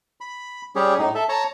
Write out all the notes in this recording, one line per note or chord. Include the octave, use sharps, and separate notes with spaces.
B5
G3 C#4 G4 G#4
A2 D#4
A4 E5
C#5 A5 A#5